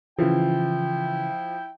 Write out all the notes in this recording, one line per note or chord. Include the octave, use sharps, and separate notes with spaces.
C#3 E3 F3 E4 G5